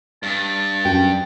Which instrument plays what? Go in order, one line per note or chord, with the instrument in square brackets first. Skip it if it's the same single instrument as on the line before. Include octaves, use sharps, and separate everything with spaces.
[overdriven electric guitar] G2 [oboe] A5
[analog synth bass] F#2 [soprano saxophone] G5